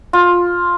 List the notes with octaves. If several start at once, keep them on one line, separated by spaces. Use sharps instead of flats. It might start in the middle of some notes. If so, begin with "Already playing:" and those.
F4